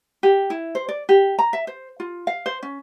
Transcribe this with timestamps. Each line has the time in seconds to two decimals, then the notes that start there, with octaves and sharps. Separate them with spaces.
0.23 G4
0.50 E4
0.75 C5
0.89 D5
1.09 G4
1.39 A#5
1.53 E5
1.67 C5
2.00 F4
2.27 F5
2.46 C5
2.63 C#4